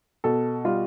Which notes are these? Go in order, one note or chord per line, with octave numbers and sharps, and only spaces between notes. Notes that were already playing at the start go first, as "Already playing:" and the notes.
B2 A4
G3 F4